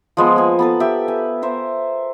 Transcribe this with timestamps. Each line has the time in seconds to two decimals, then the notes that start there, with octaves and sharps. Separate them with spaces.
0.17 F3 G#3 B3
0.36 A#3 G#5
0.59 B3 A4 B4
0.80 G4 E5
1.08 G#5
1.42 A#4 C5 E5